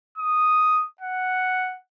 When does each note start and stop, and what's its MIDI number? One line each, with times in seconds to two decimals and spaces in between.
0.18 0.83 87
1.01 1.76 78